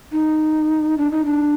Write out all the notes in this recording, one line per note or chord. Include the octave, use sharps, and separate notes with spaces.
D#4
D4
D#4
D4